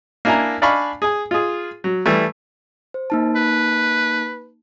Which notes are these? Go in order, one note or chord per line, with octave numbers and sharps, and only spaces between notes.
A#3 D4 E4 G#5 A#5
D4 D5 F5 G#5 B5 C#6
G#4 G#5
F4 G#4
F#3
E3 G3 A3
C5
A#3 D#4 A5
B4